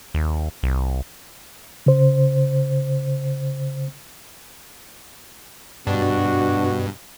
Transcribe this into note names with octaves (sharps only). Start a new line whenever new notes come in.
D#2
C2
C#3 C5
G2 B2 D4 F#4